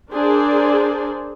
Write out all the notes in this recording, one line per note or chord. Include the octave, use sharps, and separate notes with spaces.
D4 G#4 A#4 C5 D5